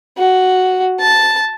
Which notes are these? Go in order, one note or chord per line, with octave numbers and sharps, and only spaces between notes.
F#4
A5